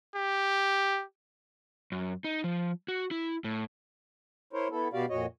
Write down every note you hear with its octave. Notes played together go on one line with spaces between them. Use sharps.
G4
F#2
D#4
F3
F#4
E4
A2
E4 A#4 C5 C#5
B3 E4 A4
B2 B3 F#4 G4 D5 F5
F2 A#2 F#4 C#5 D#5